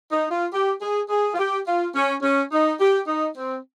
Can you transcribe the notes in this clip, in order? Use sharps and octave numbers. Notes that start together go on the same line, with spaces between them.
D#4
F4
G4
G#4
G#4
F4
G4
F4
C#4
C#4
D#4
G4
D#4
C4